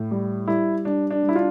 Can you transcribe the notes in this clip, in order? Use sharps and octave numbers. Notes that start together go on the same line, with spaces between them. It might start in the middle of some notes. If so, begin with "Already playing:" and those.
Already playing: A2
G3
G3 E4
G3 D4
D4
G3
E4
D4 F4